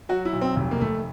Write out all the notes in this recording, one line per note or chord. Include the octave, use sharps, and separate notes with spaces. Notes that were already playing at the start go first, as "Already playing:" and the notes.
F#3 F#4
E4
B1
C4
F1
A#3
F1 A3